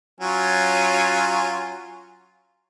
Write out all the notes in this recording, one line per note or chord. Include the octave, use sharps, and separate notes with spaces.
F#3 C#4 F4